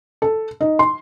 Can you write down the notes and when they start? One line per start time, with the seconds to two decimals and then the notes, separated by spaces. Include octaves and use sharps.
0.22 A4
0.61 D#4
0.79 C6